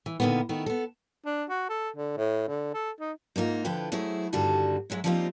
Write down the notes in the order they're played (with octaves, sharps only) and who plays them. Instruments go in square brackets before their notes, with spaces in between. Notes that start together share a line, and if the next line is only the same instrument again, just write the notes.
[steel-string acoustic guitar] E3
A#2 D3 D#3 F3 A#3 B3
D#3 A3 B3 E4
B3 A4
[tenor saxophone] D4
F#4
A4
D3
A2
D3
A4
D#4
[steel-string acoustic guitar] G#2 A#3 D#4 F4
D3 F3 E4 B4 G5
F#3 A3 E4 G#4 C5
G2 D3 D#3 G3 F#4 A5
G#2 F#3 G#3 E5
F3 G3 A#3 C4 D#4 F4